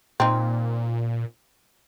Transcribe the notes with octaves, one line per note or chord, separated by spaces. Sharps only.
A#2 C4 D#4